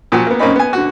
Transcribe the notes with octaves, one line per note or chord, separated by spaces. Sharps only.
A#2 F3 F#4 F#5
A#3 B3
F#2 A#3 C4 C#4 D#4 B5
B3 G#5
D3 F#4